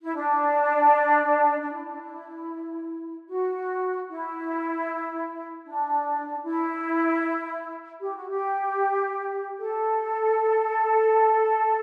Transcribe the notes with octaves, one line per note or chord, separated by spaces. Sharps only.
E4
D4
D4
E4
F#4
E4
D4
E4
G4
F#4
G4
A4